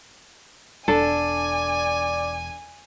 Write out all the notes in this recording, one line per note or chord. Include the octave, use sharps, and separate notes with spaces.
E1 D4 A4 D5 G#5